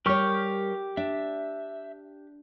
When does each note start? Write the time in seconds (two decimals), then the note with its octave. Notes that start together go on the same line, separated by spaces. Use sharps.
0.06 G3 G4 A#4 C#5 C#6 F6
0.97 D4 E5